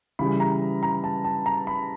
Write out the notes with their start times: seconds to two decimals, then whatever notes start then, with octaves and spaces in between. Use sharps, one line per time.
0.19 C#3 E3 G3 B5
0.40 A#5
0.83 A#5
1.04 A5
1.24 A5
1.46 A#5
1.67 B5